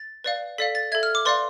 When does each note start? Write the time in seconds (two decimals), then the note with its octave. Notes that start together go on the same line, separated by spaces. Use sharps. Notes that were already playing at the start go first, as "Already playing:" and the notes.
Already playing: A6
0.24 B4 D5 F5
0.58 A4 D5 F5 B6
0.75 A6
0.92 A4 E5 G#6
1.03 F6
1.15 D6
1.25 B4 D5 F5 C6